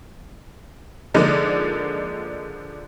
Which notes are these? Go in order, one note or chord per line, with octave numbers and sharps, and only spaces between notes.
D3 F3 G#3 A#3 D#4 D5